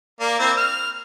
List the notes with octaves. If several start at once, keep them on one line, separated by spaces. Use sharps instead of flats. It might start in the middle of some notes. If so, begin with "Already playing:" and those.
A#3 D5
A#3 C4 E4
F6